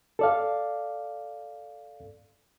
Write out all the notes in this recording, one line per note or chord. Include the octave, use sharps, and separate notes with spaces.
A4 D5 F5